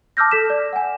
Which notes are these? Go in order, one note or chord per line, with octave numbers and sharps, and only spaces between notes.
A5 D6 E6 F6 G6 A#6
A4 B6 E7
D5
F#5 G#5